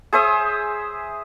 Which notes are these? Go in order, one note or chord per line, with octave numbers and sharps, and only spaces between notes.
G#4 C5 E5 D#6